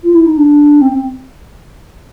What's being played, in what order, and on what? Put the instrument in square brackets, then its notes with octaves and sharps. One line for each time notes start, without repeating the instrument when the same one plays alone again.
[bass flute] F4
E4
D#4
D4
C4
C4